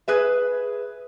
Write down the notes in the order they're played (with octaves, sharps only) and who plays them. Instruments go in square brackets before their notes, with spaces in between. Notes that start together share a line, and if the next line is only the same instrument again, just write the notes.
[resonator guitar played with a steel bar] G#4 B4 E5